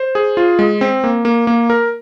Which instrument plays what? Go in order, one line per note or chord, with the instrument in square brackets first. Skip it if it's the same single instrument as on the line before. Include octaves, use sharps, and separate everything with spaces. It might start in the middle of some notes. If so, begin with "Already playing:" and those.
Already playing: [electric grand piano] C5
G#4
F4
G#3
C4
A#3
A#3
A#3
A#4